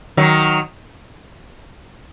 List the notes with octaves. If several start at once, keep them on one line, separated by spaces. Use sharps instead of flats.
D#3 F#3